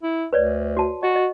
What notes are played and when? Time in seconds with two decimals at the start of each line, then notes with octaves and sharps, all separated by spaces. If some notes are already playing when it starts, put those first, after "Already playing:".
0.03 E4
0.33 D2 B4 C#5 D5
0.77 F#4 A5
1.03 F#4 D#5
1.15 D#5